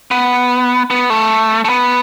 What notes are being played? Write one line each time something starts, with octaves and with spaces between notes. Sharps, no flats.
B3
B3
A3
A3
B3